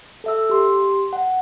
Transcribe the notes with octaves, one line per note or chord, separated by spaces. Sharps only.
A4 E5 E6
G4 C6
F#5